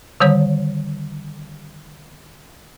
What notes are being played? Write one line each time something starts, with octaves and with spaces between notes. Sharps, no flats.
D3 D#3 G3 C#5